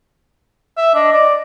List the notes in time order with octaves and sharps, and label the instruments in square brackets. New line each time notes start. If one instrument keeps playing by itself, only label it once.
[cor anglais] E5
[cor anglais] D4 [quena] D#5
[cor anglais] D5